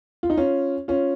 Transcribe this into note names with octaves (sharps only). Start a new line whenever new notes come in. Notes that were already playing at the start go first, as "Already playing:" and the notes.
F4
D#4
C#4 F4
C#4 F4